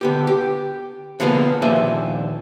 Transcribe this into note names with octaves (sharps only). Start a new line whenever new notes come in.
D3 B3 G4
G4
D3 F3 A#3 B3 G#4
D#2 A#2 F3 D4 E5 G#5